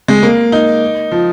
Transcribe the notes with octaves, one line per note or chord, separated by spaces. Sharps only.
G#3
A#3
D#4
F3